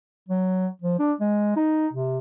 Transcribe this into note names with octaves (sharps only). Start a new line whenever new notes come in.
F#3
F3
D4
G#3
D#4
C3